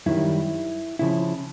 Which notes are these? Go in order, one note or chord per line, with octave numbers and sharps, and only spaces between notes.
F#2 D#3 G3 E4
C#3 F3 E4